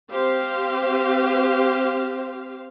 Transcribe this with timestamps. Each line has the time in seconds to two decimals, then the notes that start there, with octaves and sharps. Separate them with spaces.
0.11 C4 G4 C5 F5